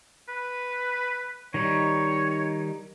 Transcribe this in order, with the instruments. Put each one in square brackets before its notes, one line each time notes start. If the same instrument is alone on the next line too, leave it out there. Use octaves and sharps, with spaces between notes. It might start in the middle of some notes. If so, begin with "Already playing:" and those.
[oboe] B4
[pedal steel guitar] D#3 G3 D#4 [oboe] C#5